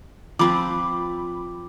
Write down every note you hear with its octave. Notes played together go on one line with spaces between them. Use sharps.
F3 C4 B4 B5 D6